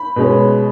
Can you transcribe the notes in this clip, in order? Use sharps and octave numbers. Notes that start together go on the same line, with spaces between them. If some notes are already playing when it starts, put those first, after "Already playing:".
Already playing: B5
B2 G#3 C#4